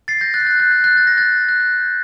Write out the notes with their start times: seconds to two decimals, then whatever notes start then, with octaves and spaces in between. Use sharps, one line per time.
0.08 A6 C7
0.21 G6 A#6
0.34 F#6 A6
0.47 F#6
0.59 F#6 A6
0.72 G6
0.84 F#6 A6
0.97 A6
1.07 A#6
1.17 F#6 A6
1.49 F#6
1.60 G6